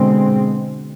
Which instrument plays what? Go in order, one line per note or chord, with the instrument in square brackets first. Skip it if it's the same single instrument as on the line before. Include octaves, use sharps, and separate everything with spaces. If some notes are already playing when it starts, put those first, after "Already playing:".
Already playing: [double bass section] B2 G#3 C4 [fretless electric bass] D3